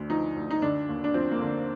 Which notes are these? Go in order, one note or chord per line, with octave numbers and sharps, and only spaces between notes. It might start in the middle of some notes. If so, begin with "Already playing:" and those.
Already playing: D2 D3
F3 D#4
D2
D#4
D3 D4
D#2
D4
F3 C4
A#3
D3